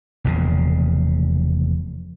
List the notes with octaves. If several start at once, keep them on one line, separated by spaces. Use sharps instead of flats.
F1 E2 A#2 C#3